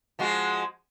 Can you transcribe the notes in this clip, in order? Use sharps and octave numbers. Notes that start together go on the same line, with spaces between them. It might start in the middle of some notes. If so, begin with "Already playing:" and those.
F3 G#3 F#4